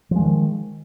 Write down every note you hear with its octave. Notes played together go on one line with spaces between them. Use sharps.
D#3 F3 G#3